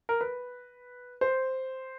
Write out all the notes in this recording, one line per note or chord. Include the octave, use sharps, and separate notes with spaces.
A#4
B4
C5